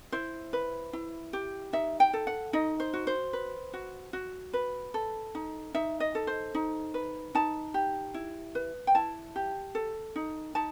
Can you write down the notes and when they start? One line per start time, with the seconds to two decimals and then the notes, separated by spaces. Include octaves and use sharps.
0.12 E4 C5
0.53 B4
0.93 E4
1.33 G4
1.73 D#4 E5
2.00 G5
2.13 A4
2.27 F#5
2.53 D#4 D#5
2.80 C5
2.94 F#4
3.07 C5
3.33 B4
3.73 F#4
4.13 F#4
4.53 B4
4.94 A4
5.35 D#4
5.74 D#4 E5
6.00 D#5
6.15 A4
6.27 C5
6.55 D#4
6.94 B4
7.35 D#4 A5
7.74 G4
8.14 E4
8.55 B4
8.87 G5
8.95 E4 A5
9.36 G4
9.75 A4
10.16 D#4
10.55 D#4 A5